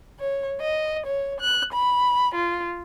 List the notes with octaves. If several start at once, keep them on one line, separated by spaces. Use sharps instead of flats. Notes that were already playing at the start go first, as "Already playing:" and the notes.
C#5
D#5
C#5
F#6
B5
F4